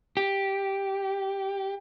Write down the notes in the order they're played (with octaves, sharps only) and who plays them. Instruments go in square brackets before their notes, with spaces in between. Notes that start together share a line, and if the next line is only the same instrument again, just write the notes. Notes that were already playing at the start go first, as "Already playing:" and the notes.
[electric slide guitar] G4